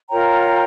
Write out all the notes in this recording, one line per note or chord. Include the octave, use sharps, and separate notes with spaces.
F4 A#4 C#5 G5 A#5